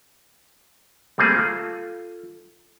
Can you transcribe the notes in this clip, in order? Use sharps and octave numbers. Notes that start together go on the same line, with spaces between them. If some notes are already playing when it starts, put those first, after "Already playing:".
G3 A3 A#3 C4 G#4
F4 A4